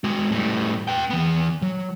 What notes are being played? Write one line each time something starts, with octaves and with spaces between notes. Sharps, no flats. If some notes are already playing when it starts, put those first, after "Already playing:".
G#3 F#4
A2 G3
B4 G5
E3 B3
F#3